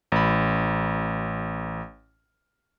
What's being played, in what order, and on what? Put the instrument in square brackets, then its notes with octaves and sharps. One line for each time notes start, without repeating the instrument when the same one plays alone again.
[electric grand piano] A1 B5